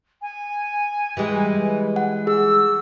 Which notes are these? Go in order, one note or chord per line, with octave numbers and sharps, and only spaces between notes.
G#5
E3 G3 G#3
F#5
G#4 E6